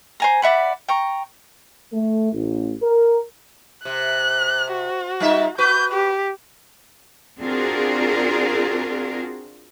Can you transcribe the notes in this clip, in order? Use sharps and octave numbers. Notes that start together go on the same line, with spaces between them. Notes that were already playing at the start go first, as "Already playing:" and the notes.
C5 G#5 A#5
D5 E5 F#5 B5
G5 A#5 C#6
A3
A1
A#4
C3 F#6
F#4
G3 D#4 E5
F#4 B4 G6
G4
C4 D4 F4 F#4 G#4 A#4